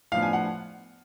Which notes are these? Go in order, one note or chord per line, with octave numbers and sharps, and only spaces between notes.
A2 F3 B3 D4 F5
G#5
F#5